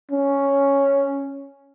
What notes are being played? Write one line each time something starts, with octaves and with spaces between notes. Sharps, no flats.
C#4